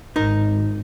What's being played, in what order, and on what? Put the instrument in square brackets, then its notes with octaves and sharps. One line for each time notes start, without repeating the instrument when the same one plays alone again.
[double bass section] G#1 [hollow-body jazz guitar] D#4 A#4